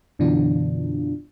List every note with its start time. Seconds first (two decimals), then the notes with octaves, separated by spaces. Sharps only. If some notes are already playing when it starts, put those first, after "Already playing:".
0.19 F#2 B2 D3 E3 D4 F4